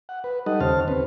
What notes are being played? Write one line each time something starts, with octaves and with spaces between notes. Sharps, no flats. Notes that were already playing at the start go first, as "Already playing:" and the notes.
F#5
B4
G3 D#4 A4 D#5 F#5
D#2 C#3 C#4 C5 A5 F6
D#2 C4 C#4 B4